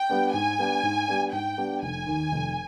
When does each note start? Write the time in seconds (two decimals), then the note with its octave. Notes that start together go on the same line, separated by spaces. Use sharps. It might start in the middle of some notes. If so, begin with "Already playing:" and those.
Already playing: G5
0.10 G3 B3 D4
0.33 G#2 G#5
0.58 G3 B3 D4
0.83 G#2
1.08 G3 B3 D4
1.32 G#2 G5
1.58 G3 B3 D4
1.82 F1 G#5
2.07 D#2 D#3
2.32 F1